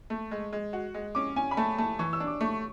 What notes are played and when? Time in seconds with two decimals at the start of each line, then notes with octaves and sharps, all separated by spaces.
0.10 A3
0.31 G#3
0.53 G#3
0.73 F#4
0.94 G#3
1.15 C#4 D6
1.36 C#4 G#5
1.51 B5
1.57 A3 A5
1.78 A3 A5
1.99 E3 C#6
2.13 E6
2.20 D4
2.27 D6
2.40 A3 C#6